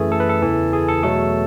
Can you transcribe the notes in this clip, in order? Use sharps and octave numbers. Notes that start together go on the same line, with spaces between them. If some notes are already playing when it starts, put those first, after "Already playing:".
Already playing: F#2 E3 A3 G#4
A4
B4
A4
E2 C#3 E3
G#4
A4
E2 B2 F#3 A3 A4